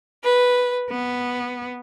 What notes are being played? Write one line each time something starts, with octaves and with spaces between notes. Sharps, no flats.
B4
B3